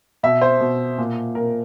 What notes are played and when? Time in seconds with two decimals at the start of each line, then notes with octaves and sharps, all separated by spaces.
0.23 B2 E5
0.41 C5
0.61 B2
0.98 A#2
1.35 A#2 A#4